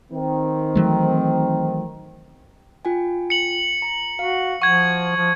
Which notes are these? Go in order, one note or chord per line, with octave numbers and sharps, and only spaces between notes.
D#3 C4
E3 F#3 A3
F4 G5 G#5
C#7 F#7
A#5
F#4 F5
F3 F#5 C#6 G#6
F3